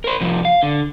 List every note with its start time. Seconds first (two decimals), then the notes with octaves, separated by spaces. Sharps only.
0.04 A#4 C5
0.21 C2 F3
0.45 F5
0.63 D3